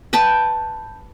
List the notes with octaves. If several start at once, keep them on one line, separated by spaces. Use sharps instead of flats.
B4 G5 A5